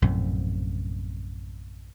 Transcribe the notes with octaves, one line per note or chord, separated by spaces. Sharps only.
A#1 F#2 A2 C3